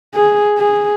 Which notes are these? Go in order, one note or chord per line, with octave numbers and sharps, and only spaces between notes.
G#4
G#4